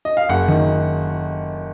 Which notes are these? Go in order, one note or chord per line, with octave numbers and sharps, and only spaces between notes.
D#5
F5
F#1 F#5
D#3